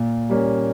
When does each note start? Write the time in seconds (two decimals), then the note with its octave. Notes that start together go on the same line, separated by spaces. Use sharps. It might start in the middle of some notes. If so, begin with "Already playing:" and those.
Already playing: A#2
0.30 G3 A#3 C#4